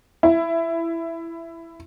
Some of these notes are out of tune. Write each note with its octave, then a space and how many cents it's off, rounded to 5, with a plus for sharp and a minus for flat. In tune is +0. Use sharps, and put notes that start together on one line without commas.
E4 +15